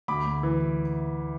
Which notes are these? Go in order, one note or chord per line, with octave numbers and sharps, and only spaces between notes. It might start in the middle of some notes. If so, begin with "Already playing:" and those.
D2 B5 D6
D2
E3